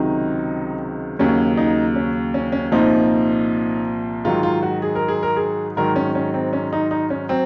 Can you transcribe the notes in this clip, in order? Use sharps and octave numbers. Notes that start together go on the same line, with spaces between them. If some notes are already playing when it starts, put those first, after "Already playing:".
Already playing: C#2 C3 D#3 F#3 D#4
D#2 C#3 F#3 C#4
D#4
C#4
C#4
C#4
C2 A#2 F3 D#4
G#2 D#3 F#3 F4
F4
F#4
G#4
A#4
G#4
A#4
G#4
G#2 D#3 F#3 A#4
C#4
C#4
C4
C#4
D#4
D#4
C#4
F#3 C4